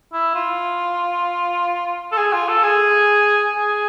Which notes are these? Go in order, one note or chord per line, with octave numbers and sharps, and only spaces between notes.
E4
F4
A4
G#4
F4
A4
G#4
G#4